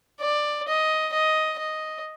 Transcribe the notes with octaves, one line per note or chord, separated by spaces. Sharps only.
D5
D#5
D#5
D#5